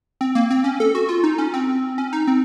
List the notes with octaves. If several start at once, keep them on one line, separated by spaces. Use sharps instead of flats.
C4
A#3
C4
C#4
A4
F#4
F4
D#4
C#4
C4
C#4
D#4
C4